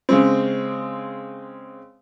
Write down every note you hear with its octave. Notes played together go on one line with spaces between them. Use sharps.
C#3 G#3 C4